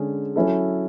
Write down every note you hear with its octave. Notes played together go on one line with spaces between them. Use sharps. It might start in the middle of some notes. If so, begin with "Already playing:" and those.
Already playing: D3 G#3 C#4 G#4
F#3 C#4 E4 A4